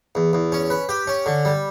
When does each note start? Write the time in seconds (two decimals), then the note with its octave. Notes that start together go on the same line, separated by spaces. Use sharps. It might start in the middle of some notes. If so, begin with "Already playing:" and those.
0.15 E2
0.33 E2
0.52 C#4
0.70 B4
0.89 G4
1.07 C#4
1.26 D3
1.45 G3